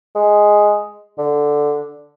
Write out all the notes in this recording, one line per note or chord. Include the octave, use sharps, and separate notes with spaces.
G#3
D3